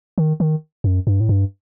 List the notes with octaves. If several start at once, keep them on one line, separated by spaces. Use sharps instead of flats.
D#3
D#3
F#2
G2
A2
G2